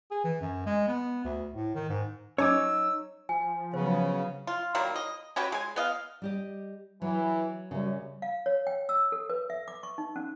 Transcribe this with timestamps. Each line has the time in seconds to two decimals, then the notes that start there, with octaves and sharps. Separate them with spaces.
0.11 G#4
0.24 E3
0.41 F#2
0.66 G#3
0.87 B3
1.24 D2
1.54 A2
1.75 D#3
1.89 G#2
2.38 F#3 C#4 D#4 C#5 G#5 D6 E6
3.29 F3 G#5
3.74 C#3 F#3 B3 C5
4.47 F4
4.75 D#3 F#3 G3 A#3
4.96 D#5
5.36 C#4 F#4 G4 B4
5.52 G#3 G#5
5.76 B3 D#5 F5
6.22 G3 G4 D#5
7.02 E3 F#3
7.71 F#2 C#3 G3
8.22 F5
8.46 C#5
8.67 G5
8.89 E6
9.12 A4
9.30 B4
9.50 E5
9.68 D6
9.83 C#6
9.98 D#4
10.16 C#4